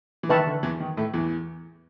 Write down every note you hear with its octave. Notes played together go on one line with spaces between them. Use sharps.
E3
D#3 B4 E5 A5 C#6
D3
E2 E3
D#3
A2 A3
E2 E3